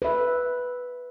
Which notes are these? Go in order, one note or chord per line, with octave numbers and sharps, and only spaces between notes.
B4 E5